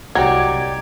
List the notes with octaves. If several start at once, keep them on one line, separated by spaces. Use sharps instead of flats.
C2 F#3 D#4 G4 D5 G#6